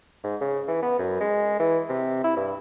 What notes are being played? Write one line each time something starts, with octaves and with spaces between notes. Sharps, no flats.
G#2
C#3
E3
B3
F#2
G#3
E3
C3
E4
G2